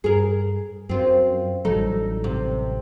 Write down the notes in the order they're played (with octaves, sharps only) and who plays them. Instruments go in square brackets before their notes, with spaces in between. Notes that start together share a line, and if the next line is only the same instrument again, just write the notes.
[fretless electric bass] G2 [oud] G#4 A#4
[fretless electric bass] F#2 [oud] C4 F4
[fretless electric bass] A1 F#3 G3 [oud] D#4 A4
[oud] C3